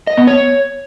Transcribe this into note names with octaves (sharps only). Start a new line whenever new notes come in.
D#5
B3
C#5